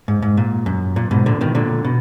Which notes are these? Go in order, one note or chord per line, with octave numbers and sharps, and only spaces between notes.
G#2
G#2
A#2
F#2
A#2
G#2 B2
A#2 D3
B2 D#3
A#2 D3
B2